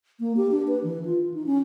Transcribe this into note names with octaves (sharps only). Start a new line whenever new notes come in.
A#3
G4
D4
B4
E3
F4
D#4
C#4